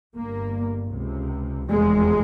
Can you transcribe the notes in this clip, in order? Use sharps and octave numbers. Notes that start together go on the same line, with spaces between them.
G1 G2 A#3
C#2 C3
F1 E2 C3 G#3